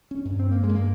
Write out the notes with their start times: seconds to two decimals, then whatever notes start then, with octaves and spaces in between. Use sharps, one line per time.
0.11 C#4
0.25 G2
0.40 C4
0.51 A#3
0.63 G#3
0.69 G2
0.75 A#3